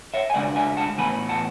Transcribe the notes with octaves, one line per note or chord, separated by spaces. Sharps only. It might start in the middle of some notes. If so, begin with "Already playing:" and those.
C#5 E5
G#5
C#3 G#3 D4 D5 F#5
E5 G#5
F#5 A5
A2 E3 B3 G#5 B5
F#5 A5